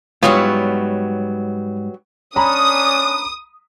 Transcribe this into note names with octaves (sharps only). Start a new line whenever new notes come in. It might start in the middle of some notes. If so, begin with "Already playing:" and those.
G#2 F#3 G3 B3 F4 C#5
C#4 D4 A#5 B5 D#6